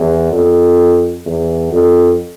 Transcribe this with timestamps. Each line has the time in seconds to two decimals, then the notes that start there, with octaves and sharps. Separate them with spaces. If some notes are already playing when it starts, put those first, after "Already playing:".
Already playing: E2
0.32 F2
1.26 E2
1.72 F2